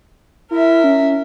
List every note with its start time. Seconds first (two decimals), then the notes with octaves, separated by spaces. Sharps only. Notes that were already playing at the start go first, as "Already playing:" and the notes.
0.51 E4 A#4 E5
0.84 C#4